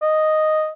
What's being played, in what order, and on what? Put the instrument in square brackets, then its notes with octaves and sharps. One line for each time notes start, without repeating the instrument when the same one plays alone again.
[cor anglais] D#5